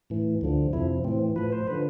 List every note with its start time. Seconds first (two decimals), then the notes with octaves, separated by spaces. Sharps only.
0.10 A2 E3
0.41 D2 D3 F3
0.73 F2 C3 F3 E4
1.04 A2 E3 C4
1.36 A2 F3 B4
1.52 C5
1.67 D3 F3 B4